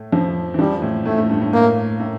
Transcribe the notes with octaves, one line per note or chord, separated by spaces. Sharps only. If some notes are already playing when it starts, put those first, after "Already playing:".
Already playing: A2 A3
F2 F3
E3
F2 F3 G3
A2
A2 A3
A2
G2
A2
A2 A#3
A2